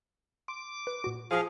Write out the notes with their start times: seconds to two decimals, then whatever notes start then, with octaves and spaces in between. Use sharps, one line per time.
0.48 C6 D6
0.87 B4 D7
1.04 A#2 F#4
1.31 F3 G#4 F5